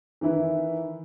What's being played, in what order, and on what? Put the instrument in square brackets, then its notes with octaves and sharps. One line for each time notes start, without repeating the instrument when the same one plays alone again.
[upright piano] D#3 E3 E4 B4